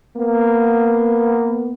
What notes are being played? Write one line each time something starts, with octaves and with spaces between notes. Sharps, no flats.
A#3 B3